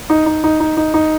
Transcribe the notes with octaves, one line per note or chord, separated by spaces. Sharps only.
D#4
D#4
D#4
D#4
D#4
D#4